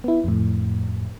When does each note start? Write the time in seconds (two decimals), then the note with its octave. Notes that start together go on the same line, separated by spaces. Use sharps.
0.04 B3 E4
0.24 F2 A2